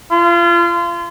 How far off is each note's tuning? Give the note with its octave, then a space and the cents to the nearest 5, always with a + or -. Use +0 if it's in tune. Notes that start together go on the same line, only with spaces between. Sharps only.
F4 -30